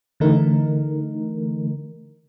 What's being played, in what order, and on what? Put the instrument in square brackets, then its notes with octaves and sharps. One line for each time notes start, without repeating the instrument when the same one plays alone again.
[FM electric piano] D3 E3 A3 D#4 A#4